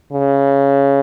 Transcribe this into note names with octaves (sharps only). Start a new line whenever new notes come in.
C#3